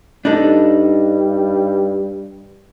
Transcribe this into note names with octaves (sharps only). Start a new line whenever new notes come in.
G2 D4 D#4 A4